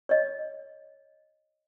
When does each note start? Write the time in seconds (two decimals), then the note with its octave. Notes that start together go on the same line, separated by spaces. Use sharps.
0.09 C#5 D#5